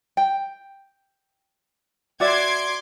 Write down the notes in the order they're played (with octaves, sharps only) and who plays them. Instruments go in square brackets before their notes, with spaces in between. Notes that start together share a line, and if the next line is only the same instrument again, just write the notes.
[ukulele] G5
[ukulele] F#4 D5 E5 [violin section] C6 D6 G#6